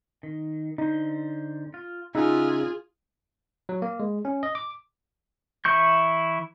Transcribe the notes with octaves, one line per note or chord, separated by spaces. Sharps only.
D#3
D3 D#4 C5
F4
C#3 D#4 F4 G#4 E5 F#5 G#5
F#3
A#3
G#3
C#4
D#5
D6
E3 E4 C#6 G6